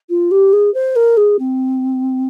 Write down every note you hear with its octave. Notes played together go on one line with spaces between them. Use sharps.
F4
G4
G#4
C5
A#4
G#4
C4